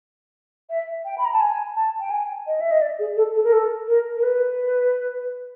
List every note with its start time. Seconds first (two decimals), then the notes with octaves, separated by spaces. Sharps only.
0.70 E5
1.05 G5
1.18 B5
1.25 A#5
1.33 A5
1.41 G#5
1.76 A5
2.00 G5
2.10 G#5
2.47 D#5
2.61 E5
2.71 D#5
2.81 D5
2.99 G#4
3.17 A4
3.35 A4
3.44 A#4
3.52 A4
3.87 A#4
4.17 A#4
4.23 B4